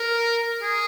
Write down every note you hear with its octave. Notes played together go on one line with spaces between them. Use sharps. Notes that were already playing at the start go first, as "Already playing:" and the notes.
Already playing: A#4
G#4